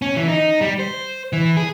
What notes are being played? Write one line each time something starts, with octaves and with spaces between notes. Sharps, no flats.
C#4
E3
D#4
G3
C5
E3
G#4